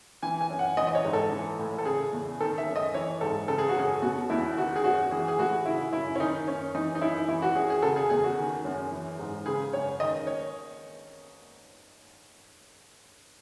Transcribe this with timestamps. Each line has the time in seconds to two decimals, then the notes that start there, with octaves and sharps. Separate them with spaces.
0.23 E3 G#5
0.41 G#5
0.50 F#2
0.59 F#5
0.77 E3 D#5
0.87 D#5
0.95 C#5
1.05 G#2
1.13 A4
1.31 E3
1.59 A2
1.78 A4
1.85 C#3 G#4
2.13 E2
2.40 D#3 A4
2.58 E5
2.66 F#2
2.76 D#5
2.94 E3 C#5
3.21 G#2 A4
3.48 C#3 A4
3.58 G#4
3.69 F#4
3.76 F#2 G#4
4.02 B2 F#4
4.30 E2 E4
4.57 D#3 F#4
4.76 G#4
4.84 F#2 F#4
5.11 E3 G#4
5.28 G#4
5.39 A2 F#4
5.66 C#3 E4
5.93 F#2 E4
6.16 C#4
6.20 D#3 D#4
6.48 F#2 C#4
6.74 E3 D#4
6.95 D#4
7.01 F#2 E4
7.28 E3 E4
7.42 F#4
7.55 F#2 G#4
7.70 G#4
7.82 C#3 A4
7.96 G#4
8.10 E2 G#4
8.24 F#4
8.37 D#3
8.65 F#2
8.92 E3
9.19 G#2
9.46 C#3 G#4
9.73 F#2 C#5
10.00 D#3 D#5
10.27 C#5